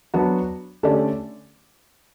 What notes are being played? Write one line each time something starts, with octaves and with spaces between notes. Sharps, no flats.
F#3 B3 D4 F#4
D3 A3 C#4 G4 D5